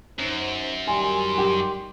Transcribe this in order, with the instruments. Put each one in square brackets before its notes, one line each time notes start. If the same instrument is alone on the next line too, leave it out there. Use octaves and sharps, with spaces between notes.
[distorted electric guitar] F#2 [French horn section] D#4 C5
[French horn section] D#3 G3 [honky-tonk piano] G#5 [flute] C6
[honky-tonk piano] G4